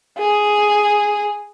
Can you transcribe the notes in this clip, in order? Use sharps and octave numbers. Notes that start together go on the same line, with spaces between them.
G#4